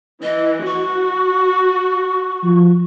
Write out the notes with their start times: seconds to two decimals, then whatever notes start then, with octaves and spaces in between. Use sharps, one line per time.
0.23 E3 D#5
0.67 F#4 C#6
2.44 F3